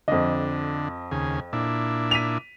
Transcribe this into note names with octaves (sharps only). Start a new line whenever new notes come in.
F2 D3 D#5
D#2 C#3 G#4
A#2 D4 E4
B6 D#7 F7